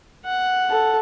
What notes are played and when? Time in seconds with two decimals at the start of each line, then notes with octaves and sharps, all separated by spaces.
0.24 F#5
0.70 A4